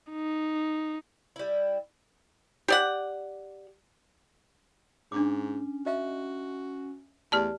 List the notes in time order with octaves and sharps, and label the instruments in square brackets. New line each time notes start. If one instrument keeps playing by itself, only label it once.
[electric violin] D#4
[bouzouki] G3 E4
[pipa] G4 D5 F#5
[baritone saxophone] G#2 [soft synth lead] C#4 [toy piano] D4 D6
[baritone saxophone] F#4 [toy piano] D#5 E5
[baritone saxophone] E2 [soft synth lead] A3 [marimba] G4 D5 A5